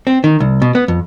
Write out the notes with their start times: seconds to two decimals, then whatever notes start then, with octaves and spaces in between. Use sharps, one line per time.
0.07 C4
0.24 D#3
0.40 C2
0.62 B2
0.75 B3
0.88 F2